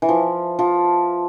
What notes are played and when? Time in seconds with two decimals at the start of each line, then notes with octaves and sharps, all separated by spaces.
0.02 E3
0.09 F3
0.59 F3